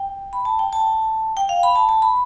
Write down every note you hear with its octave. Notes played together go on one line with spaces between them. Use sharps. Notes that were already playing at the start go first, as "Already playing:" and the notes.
Already playing: G5
B5
A5
G5
A5
G5
F5
B5
A5
A5
B5